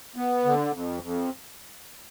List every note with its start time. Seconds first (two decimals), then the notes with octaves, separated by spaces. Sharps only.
0.16 B3
0.45 D3
0.74 F2
1.03 F2